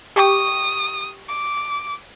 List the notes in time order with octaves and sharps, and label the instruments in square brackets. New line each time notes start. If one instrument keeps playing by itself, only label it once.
[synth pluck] G4 G5 C#6 [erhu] D#6
[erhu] D6